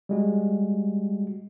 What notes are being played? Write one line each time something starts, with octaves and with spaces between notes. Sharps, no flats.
G3 G#3 F#4